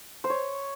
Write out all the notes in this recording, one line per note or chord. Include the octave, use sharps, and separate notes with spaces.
C5
C#5